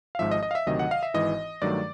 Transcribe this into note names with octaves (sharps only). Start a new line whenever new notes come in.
F5
G#1 G#2 F3 E5
D#5
D#5
F5
E5
D2 C3 D#3 F#3 D#5
F#5
F5
E5
G#1 G#2 E3 D#5
G2 D#3 F#3 A3 D5